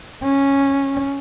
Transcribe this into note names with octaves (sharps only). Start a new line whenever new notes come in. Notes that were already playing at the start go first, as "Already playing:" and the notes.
C#4